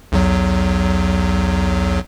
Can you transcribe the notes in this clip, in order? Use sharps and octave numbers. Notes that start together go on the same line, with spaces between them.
B1 E2 F#3